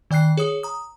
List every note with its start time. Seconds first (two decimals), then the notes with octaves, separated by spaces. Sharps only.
0.11 D#3 D5 G5 F#6 C7
0.37 G#4 C#5 D#6
0.63 A#5 D#6